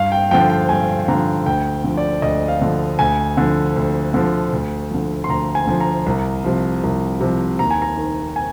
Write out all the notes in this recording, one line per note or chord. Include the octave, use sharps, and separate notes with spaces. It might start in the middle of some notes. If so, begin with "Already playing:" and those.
Already playing: G2 F5
G5
D3 F3 G5
G5
G2 G#5
D3 F3 A#5
D2 G5
D3 F3
D5
D2 D#5
F5
D3 F3
D2 G#5
D3 F3
D2
D3 F3
D2
D3 F3
C6
D2 A#5
G#5
D3 F3
A#5
C2
C3 F3
C2
C3 F3
D#2 A#5
G#5
A#5
D#3
G#5